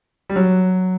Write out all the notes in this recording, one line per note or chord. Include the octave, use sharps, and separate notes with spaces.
G3
F#3